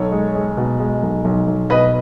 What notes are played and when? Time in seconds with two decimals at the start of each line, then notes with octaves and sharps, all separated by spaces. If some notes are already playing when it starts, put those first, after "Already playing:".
Already playing: B1 A4 C#5
0.12 G#3
0.35 G#3
0.57 B2
0.80 G#3
1.03 B1
1.25 B1
1.47 B1
1.70 B2 B4 D#5